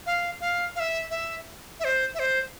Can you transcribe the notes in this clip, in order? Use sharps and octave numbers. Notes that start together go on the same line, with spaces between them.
F5
F5
F5
E5
E5
E5
C5
E5
C5